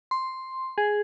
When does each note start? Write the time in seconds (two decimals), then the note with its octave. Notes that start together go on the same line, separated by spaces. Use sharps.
0.11 C6
0.78 G#4